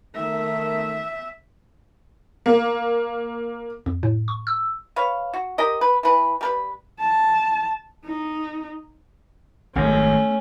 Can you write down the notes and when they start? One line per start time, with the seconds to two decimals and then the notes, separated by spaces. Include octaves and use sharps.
0.16 D#3 A3 E5
2.46 A#3
3.86 F2
4.03 A2
4.28 C#6
4.47 E6
4.96 B4 C#5 F5
5.34 F#4
5.58 G4 A#4 D#5
5.81 B4
6.03 E3 B4
6.41 G3 A#4 B4
7.00 A5
8.05 D#4
9.75 G#1 F#2 A3 C#4